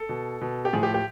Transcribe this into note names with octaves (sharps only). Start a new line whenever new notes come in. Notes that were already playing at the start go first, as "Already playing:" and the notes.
Already playing: A4
B2
B2
G4
A2 F3 G#4
G4
G4